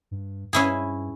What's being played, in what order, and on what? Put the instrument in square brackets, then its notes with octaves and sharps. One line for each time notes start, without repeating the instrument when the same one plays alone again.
[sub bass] G2
[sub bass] G2 [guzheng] C#4 E4 G#4